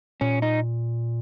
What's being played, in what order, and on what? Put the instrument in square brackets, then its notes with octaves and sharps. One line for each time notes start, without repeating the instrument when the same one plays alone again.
[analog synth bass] A#2 [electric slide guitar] C#4
[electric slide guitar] D#4